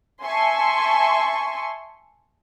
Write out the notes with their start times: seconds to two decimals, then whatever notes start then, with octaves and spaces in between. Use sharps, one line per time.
0.23 E5 G#5 A5 C6 C#6